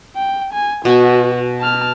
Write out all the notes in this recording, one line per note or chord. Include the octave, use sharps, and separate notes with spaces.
G5
G#5
B2 F#4 G#5
A5 F6